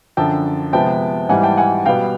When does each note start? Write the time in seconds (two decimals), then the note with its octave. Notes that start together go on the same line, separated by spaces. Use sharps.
0.17 F#2 D3 F3 G5 A5
0.73 C3 F3 G#3 B3 G5 A5
1.29 G#2 E3 G3 F#5 G#5
1.43 G5 A5
1.57 F#5 G#5
1.86 B2 G3 B3 F5 G5